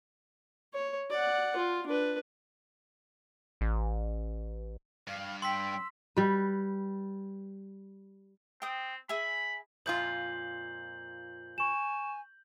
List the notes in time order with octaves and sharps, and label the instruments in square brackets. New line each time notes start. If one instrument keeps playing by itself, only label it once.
[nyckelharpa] C#5
D5 F#5
F4
D4 B4
[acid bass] A1
[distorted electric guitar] G2 [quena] F5
[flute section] G5 [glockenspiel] C6 B6 [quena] E6
[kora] G3 B4
[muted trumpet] C4 [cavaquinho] G5 D#6
[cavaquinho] G#4 E5 G#5 [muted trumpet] B5
[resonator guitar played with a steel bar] F2 A#2 F4 [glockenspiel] G6 F#7
[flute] G#5 [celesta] C#6 E7